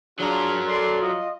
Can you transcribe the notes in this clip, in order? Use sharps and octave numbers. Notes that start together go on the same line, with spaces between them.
F#3 D4 F4 G#4 A#4
A4 D5 C6
F4 D#5